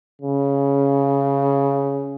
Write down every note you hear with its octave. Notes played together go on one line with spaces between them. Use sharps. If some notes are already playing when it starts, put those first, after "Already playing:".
C#3